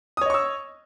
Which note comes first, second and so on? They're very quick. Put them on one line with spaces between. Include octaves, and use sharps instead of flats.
D#6 C#5 D#5 C#6 E6